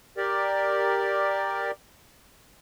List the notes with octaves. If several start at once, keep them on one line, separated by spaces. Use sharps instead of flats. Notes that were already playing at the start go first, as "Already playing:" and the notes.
G4 A#4 D5